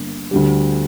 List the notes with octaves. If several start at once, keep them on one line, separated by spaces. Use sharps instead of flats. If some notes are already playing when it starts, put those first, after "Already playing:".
Already playing: G1 D3 A#3
D2 D3 G3